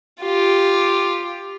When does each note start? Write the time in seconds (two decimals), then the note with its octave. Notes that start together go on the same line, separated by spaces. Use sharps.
0.21 F4 G4